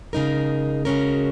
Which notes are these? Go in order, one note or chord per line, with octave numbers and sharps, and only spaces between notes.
C#3 G#3 D#4 A#4
C#3 G#3 C#4 F#4 A#4